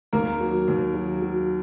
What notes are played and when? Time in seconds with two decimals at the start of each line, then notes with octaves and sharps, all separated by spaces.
0.13 D#2 A#3 A#4
0.40 F#3
0.68 D#2
0.94 F#3
1.22 F#3